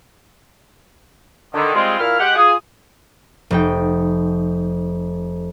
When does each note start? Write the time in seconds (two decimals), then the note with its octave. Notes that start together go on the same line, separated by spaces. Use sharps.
1.54 D3 D#3
1.74 G3 G#3 C4 F4
1.99 A#2 A#3 E4 F5 F6
2.20 G#3 G4 F#5
2.36 F4 G#4 D#6
3.51 F1 D#4 G5